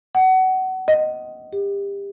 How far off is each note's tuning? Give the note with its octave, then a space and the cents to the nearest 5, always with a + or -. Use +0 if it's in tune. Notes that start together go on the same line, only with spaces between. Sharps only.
F#5 +25
D#5 +5
G4 +30